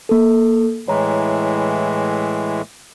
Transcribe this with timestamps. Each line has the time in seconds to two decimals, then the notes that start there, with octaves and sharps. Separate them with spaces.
0.09 A#3 A4
0.88 A2 E3 G#3 C#5 A#5